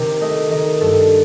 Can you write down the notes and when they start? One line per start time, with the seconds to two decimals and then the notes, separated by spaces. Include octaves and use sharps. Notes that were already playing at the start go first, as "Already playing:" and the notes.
Already playing: C3 D#3
0.21 A3 D#5
0.51 D#3 D#5
0.81 G2 A4